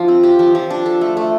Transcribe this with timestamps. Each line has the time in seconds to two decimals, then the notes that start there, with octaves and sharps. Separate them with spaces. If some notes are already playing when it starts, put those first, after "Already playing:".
Already playing: F3 D4 F4
0.08 C4
0.23 G4
0.39 F3
0.55 F3
0.71 D4
0.86 A4
1.01 A3
1.17 A3